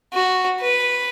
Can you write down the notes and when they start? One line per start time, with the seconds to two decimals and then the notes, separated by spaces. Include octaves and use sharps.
0.13 F#4
0.61 B4